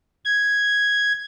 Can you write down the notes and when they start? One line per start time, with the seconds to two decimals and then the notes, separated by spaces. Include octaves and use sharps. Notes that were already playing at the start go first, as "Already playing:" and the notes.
0.25 G#6